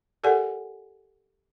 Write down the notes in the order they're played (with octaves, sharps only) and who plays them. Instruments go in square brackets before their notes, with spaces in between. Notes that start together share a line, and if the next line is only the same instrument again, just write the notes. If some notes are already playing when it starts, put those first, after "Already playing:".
[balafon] G4 A4 A#4 D5 F#5 G#5